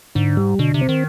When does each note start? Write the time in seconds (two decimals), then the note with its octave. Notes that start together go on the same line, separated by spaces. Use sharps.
0.15 G#2 D3
0.37 G3
0.59 B2 D3
0.74 C3
0.81 C4
0.89 D#3